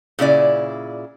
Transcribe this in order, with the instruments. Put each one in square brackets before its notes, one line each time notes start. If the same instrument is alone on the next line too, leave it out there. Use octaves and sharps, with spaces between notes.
[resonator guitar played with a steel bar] A#2 C#3 E4 D5